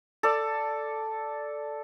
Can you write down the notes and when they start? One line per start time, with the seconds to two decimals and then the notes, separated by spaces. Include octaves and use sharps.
0.23 A4 D5